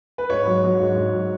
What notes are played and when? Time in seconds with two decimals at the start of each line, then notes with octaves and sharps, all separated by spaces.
0.18 B4
0.30 G#2 C#5
0.46 F#3
0.64 F#3
0.79 G#2
0.96 G#2
1.13 F#3